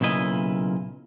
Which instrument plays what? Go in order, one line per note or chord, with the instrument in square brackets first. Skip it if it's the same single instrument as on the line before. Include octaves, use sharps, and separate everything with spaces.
[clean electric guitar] B1 A#2 C#3 E4 D#5